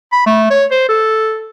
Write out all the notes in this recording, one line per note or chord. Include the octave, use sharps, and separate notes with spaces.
B5
A3
C#5
C5
A4